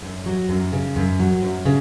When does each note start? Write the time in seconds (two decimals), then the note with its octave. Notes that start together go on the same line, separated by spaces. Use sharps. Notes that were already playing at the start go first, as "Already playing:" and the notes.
0.02 F#2
0.26 F#3
0.49 F#2
0.72 C#3
0.96 F#2
1.20 F#3
1.42 F#2
1.65 C#3